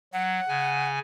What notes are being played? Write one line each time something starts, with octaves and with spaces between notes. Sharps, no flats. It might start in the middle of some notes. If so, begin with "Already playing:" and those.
F#3 F#5
C#3 G#5